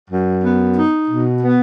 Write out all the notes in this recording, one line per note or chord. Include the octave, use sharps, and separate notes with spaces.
F#2
B3
D#4
B2
B3